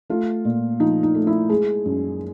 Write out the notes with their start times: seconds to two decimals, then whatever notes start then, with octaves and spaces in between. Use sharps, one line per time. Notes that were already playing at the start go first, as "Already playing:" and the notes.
0.10 A3 F4
0.45 A#2
0.80 F3 D#4
1.03 D#4
1.15 A3
1.27 E4
1.49 G#3 G#4
1.85 F#2